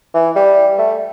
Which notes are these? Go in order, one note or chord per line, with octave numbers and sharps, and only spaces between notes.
E3
G3
A3